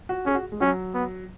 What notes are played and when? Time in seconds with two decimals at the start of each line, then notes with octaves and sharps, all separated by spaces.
0.09 F#4
0.26 C#4 G#4
0.35 F#4
0.52 G#3
0.61 F#3 C#4
0.94 B3